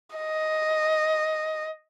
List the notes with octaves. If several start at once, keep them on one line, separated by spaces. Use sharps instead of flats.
D#5